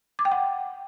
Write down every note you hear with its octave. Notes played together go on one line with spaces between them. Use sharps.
D6
G5
F#5